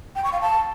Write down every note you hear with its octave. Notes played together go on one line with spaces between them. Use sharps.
G5
C#6
F5
A5